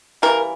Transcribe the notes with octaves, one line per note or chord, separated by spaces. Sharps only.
C#3 E3 G3 A#4